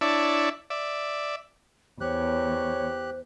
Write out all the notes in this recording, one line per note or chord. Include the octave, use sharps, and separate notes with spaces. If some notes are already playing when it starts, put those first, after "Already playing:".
D4 E4 C#5 D5 E5 A5
D5 E5
E2 G4 C5 C#5 F#6